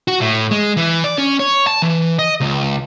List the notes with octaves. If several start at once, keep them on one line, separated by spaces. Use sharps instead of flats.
F#4
A2
G#3
E3
D5
C#4
C#5
A5
E3
D#5
C#2